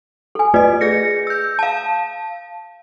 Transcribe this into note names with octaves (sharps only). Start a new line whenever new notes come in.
A4 G#5
A3 F4 B4 D5 D#5
G#4 A#6 C#7
E6 G6
F5 A5